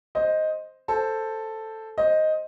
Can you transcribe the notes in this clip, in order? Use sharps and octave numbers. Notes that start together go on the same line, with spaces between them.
C5 D#5
A4 C5
C5 D#5